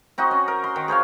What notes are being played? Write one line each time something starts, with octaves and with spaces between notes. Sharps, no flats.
C4 D#4 F#4 D#5
C#4
A#4
C6
D#3
G#4 C5 C#5 F5